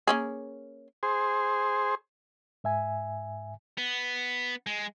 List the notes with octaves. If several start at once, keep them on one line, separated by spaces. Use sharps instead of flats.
A#3 C#4 G#4
G#4 C5
G#2 E5 G#5
B3
G#3